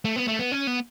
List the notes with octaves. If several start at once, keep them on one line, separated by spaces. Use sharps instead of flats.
A3
B3
A3
B3
C#4
B3